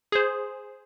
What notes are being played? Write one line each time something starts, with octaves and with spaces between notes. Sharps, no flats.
G#4 C5